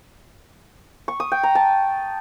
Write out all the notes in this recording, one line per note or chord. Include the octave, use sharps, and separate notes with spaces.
C#6
D#6
G5
A#5
A5